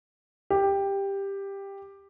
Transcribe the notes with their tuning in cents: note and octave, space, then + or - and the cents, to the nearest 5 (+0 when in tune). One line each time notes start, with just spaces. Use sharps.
G4 +10